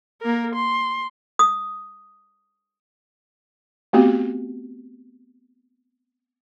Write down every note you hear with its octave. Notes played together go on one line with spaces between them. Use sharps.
A#3 A#4
C6
D#6
A3 B3 C4 F#4 G4